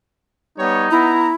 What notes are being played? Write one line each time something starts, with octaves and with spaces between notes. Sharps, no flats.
G3 B3 D#4 C#5
B3 E4 A#5